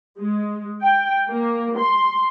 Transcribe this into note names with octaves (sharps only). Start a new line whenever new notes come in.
G#3
G5
A#3
C6